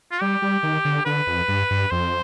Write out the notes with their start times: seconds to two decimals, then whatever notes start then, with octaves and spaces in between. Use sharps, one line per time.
0.12 F4
0.21 G3 G4
0.42 G3
0.63 D#3
0.85 D3
1.06 D3 B4
1.27 F2
1.48 G2
1.70 G2
1.91 F2 C5